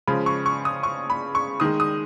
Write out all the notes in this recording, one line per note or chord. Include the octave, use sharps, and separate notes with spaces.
C#3 F3 G#3 B5
C#6
C#6
D#6
C#6
B5
C#6
D#3 G#3 D#6
D#6